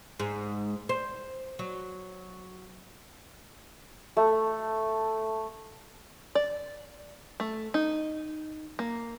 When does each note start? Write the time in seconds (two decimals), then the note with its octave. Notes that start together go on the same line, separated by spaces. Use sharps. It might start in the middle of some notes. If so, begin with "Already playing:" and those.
0.20 G#2
0.89 C5
1.59 F#3
4.17 A3
6.35 D5
7.40 A3
7.74 D#4
8.79 A#3